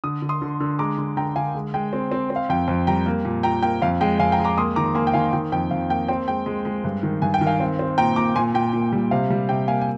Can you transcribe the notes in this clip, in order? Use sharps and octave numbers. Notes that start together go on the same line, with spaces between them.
D3 D#6
D3
C6 D#6
D3
D3
G#3 A#5 D6
D3
D3 G5 A#5
D3 F5 G#5
G#3
G#3 G5
C4
C4
C4
F5
F2 G5
F2
G3 G5 A#5
A#3
A#2
F3 G5 A#5
A#3 G5
F2 F5
G#3 G5
F2 F5 G#5
G5 A#5
G#3
A#5 D6
A#3 C6 D#6
D#3 A#5 D6
A#3 G#5 C6
G5
D#3 F5 G#5
D#3 G5
F2 G5
F2 F5
A#3 G5
C4 G5
G#3 G5
G#3
G#3
G2
D#3
G2 G#5
G5
D#3
F5 G#5
C4
C4
A#2 G5 A#5
A#2 A#5 D6
A#2 G#5 C6
A#2 G5
A#2
G3
C3 F5
G3
C3 G5
A#3 F5 G#5
G#5